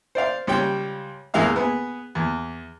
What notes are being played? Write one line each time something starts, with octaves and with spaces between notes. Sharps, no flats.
C5 D5 F5
C#2 G3 C#5 G5
E2 A2 G#3 A#3 F5 E6
B3 G#4
E2